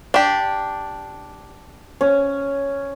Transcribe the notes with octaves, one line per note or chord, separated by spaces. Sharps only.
D4 G4
C#4